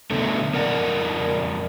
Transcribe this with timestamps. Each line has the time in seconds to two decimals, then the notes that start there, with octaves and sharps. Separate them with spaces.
0.11 B2 D3 F#3 A3
0.54 F2 A#4 D5 F#5